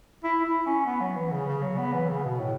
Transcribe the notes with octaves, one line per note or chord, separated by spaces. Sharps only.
E4
E4
C#4
B3
F#3
E3
C#3
C#3
F#3
B3
E3
C#3
B2
A2